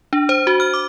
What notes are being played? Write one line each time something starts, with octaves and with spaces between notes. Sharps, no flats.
D4
C5
F#4
F6
D6